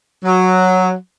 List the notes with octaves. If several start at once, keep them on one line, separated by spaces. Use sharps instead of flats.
F#3